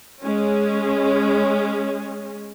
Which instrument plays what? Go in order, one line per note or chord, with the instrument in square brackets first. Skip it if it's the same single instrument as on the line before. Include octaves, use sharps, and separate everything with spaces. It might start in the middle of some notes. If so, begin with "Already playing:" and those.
[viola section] G#3 C#4